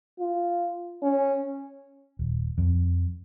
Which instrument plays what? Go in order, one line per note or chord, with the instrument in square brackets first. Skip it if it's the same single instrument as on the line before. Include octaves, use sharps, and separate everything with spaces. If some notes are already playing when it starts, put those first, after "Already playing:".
[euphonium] F4
C#4
[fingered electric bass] D#1
F2